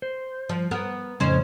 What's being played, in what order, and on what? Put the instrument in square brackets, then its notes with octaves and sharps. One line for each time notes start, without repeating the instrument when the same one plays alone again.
[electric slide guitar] C5
[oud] F3
B3 A#4
[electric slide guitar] F2 A2 C#3 [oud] C#4 D#4 C5